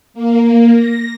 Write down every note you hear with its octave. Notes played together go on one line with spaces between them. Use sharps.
A#3
A#6